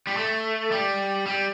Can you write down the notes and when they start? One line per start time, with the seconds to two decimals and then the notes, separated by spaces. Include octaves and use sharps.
0.07 G3
0.17 A3
0.71 G3
1.26 G3